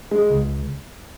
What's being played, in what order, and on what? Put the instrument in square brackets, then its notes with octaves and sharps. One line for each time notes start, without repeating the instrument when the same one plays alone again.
[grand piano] G#3
[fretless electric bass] C#2